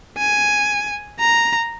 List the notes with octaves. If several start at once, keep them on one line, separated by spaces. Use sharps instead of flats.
G#5
A#5